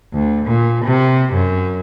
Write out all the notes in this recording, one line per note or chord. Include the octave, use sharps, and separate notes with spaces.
D2
A#2
C3
F#2